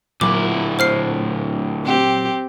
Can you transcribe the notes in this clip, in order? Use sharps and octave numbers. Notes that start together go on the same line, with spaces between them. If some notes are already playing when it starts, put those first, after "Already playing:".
D2 A#2 F#3 A#3 E4 D6
C5 F6 C7
C4 G4